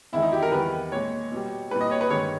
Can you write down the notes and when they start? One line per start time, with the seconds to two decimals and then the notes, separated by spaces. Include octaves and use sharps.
0.13 E2 D#3 G#3 E4
0.22 D#4
0.33 G4
0.43 A#4
0.52 E2 D#3 G3 B4
0.92 A#2 G#3 C#5
1.32 B2 G3
1.71 G3 B4
1.76 A#2
1.81 D#5
1.91 C#5
2.01 B4
2.10 G2 D#3 G#3 C#5